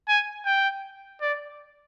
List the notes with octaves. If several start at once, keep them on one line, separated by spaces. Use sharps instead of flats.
G#5
G5
D5